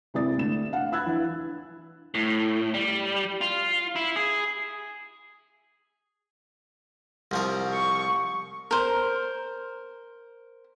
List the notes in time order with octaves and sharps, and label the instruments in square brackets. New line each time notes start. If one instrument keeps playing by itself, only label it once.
[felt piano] C3 G#3 E4 D5 D#6 A6
D2 E7
F5 F#5
B5 E6 F#6 G#6 A6
E3 D4
[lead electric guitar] A2
G3
F4
E4
G#4
[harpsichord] C2 F3 A#4
[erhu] C#6
[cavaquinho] A#4 C5